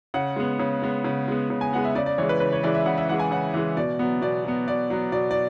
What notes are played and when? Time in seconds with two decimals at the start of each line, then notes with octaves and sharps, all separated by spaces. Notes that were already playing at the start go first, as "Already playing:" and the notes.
0.14 C#3 F#5
0.36 G#3 B3
0.59 C#3
0.82 G#3 B3
1.04 C#3
1.28 G#3 B3
1.50 C#3
1.61 G#5
1.73 G#3 B3 F#5
1.85 E5
1.95 C#3 D5
2.06 D5
2.18 E3 G#3 C#5
2.29 B4
2.40 C#3 B4
2.53 C#5
2.63 E3 G#3 D5
2.75 E5
2.85 C#3 F#5
2.98 E5
3.09 E3 F#5
3.12 G#3
3.19 G#5
3.31 C#3 F#5
3.54 E3 G#3
3.77 B2 D5
3.99 F#3 B3
4.22 B2 D5
4.45 F#3 B3
4.68 B2 D5
4.90 F#3 B3
5.12 B2 D5
5.31 D5